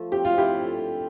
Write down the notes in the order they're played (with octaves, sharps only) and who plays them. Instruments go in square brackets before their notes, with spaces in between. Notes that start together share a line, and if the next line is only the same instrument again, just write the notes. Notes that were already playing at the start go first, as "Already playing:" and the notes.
Already playing: [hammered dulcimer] F3 A3
[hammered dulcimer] C4 [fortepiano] G4
[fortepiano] F4
[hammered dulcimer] C4 [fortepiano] E4 G4
[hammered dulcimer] D3
C4